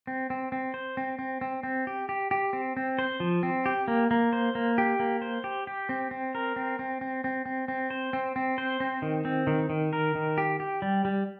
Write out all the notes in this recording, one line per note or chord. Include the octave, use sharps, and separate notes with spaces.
C4
C4
C4
C5
C4
C4
C4
C4
G4
G4
G4
C4
C4
C5
F3
C4
G4
A#3
A#3
C5
A#3
G4
A#3
C5
G4
G4
C4
C4
A#4
C4
C4
C4
C4
C4
C4
C5
C4
C4
C5
C4
D#3
C4
D#3
D#3
A#4
D#3
G4
G4
G3
G3